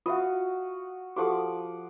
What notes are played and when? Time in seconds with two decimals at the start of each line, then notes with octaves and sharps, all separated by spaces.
0.06 F4 F#4 E5 F5 D#6
1.16 F3 F#4 G4 A4 F#5 D6